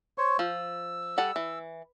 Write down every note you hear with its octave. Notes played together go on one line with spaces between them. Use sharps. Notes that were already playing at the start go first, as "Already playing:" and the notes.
C5 C#5 C#6
F3 E6
G3 A4 F#5
E3